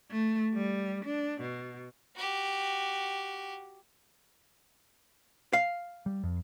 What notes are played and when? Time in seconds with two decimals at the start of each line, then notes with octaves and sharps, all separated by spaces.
0.11 A3
0.54 G3
1.05 D4
1.41 B2
2.15 F#4 G4
5.53 F5
6.06 G3
6.24 F2